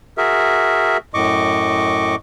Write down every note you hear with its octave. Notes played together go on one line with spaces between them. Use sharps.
F#4 G#4 A#4 E5
F#2 A2 D#5 C#6 D6